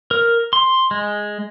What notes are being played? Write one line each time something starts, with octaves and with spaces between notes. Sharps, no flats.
A#4
C6
G#3